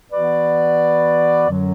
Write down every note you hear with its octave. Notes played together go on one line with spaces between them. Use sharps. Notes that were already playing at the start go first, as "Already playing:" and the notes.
E3 B3 F#4 B4 D5
F#2 D3 F#3 C#4